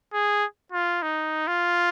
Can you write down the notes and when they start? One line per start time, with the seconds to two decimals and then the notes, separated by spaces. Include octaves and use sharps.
0.13 G#4
0.72 F4
1.03 D#4
1.47 F4